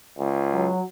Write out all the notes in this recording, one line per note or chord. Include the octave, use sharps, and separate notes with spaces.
C#2
F#3